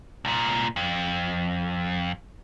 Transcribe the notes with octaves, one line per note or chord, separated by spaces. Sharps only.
C2 A#2
F2